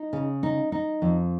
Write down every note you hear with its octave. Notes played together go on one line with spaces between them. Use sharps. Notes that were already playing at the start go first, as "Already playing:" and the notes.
Already playing: D#4
C#3
D#4
D#4
F2